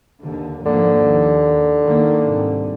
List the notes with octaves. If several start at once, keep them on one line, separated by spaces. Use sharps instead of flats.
D#2 D3
G#1 D3 F3 A#3
D#2
D#3 A#3
C2 G#2 C3